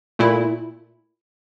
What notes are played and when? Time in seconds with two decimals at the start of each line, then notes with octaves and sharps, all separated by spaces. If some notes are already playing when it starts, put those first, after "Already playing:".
0.19 A#2 A3 E4